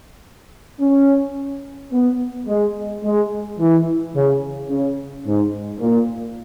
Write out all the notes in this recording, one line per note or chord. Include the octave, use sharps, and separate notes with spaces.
C#4
B3
G#3
G#3
E3
C#3
C#3
G#2
A#2